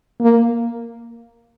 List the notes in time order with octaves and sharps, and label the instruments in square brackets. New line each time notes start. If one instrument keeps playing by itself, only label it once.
[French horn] A#3